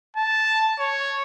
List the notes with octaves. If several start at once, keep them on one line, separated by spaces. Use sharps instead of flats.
A5
C#5